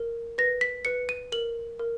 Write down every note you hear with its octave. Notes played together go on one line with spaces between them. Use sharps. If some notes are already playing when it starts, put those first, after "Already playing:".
Already playing: A#4
B4 A#6
B6
B4 C#7
D#7
A#4 F#7
A#4